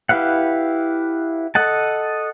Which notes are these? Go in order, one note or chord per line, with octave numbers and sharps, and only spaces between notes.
E4 G4 B4 F5 F#5
A4 D#5 F#5 A5